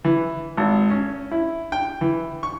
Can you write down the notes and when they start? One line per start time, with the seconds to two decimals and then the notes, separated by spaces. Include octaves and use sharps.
0.05 E3
0.57 G#1
0.90 C#4
1.31 E4
1.72 G5
2.01 E3
2.43 C#6